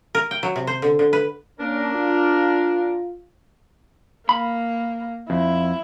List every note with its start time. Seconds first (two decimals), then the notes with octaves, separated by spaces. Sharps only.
0.15 A#4
0.31 G5
0.43 F#3
0.56 C3
0.67 C5
0.82 D3
0.99 D3
1.13 B4
1.59 A#3 C#4 D4 A#4
1.94 F4
4.29 A#3 B5
5.30 F2 E4